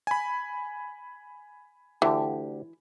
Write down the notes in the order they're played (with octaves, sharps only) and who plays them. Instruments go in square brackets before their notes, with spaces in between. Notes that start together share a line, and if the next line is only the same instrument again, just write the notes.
[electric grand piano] G#5 B5
[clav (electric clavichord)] D2 D3 G4 [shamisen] E3